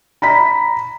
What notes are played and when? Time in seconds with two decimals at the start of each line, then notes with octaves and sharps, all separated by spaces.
0.22 A#5 B5 B6